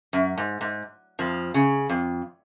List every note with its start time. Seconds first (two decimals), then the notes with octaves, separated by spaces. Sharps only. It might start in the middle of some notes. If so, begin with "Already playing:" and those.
0.13 F#2
0.38 G#2
0.61 G#2
1.19 F2 F3
1.54 C#3
1.89 F2